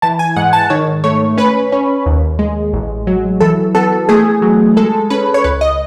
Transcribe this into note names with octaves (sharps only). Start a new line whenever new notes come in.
E3 A5
G#5
G#2 F#5
A5
D#3 C#5
A3 C#5
C#4 B4
C#4
D#2
G#3
A1
F#3
E3 A4
B3 A4
A3 G#4
F#3
G#3 A4
C#4 B4
C#5
C#2 B4
D#5